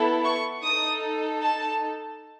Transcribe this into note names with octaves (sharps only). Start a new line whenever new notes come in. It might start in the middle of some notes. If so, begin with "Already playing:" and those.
Already playing: B3 E4 A4
C#6
D#4 A4 D#6
A5